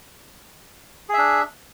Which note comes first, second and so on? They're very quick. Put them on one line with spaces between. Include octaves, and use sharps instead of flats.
G#4 E5 D4